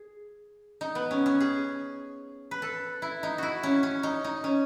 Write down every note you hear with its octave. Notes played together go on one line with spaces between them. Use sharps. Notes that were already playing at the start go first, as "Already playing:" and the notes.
Already playing: G#4
D#4
B3
C#4
C#4
G#4
B4
A4
E4
D#4
E4 F#4
C#4
C#4
D#4
D#4
C#4